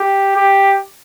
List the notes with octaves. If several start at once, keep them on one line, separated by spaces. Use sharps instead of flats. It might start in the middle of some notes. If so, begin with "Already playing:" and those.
Already playing: G4
G4